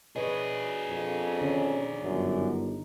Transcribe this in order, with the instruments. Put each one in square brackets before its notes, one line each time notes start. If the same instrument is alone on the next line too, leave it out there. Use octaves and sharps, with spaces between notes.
[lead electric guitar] D4 G#4 [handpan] B4 C#5 D#5
[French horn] F2
[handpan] D3 D#3 [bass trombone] C#4
[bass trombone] G1 [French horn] F#2
[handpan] D#4